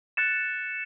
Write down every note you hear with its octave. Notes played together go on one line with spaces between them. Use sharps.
F#6 A6 C#7 E7